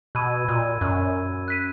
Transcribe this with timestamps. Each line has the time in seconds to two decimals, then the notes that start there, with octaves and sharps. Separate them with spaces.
0.15 B2 B5 E6 G#6 D#7
0.48 A#2
0.81 F#2
1.48 F#6 B6 D#7